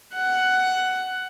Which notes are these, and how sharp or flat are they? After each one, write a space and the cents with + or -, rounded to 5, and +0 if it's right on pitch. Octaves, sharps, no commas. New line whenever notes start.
F#5 +10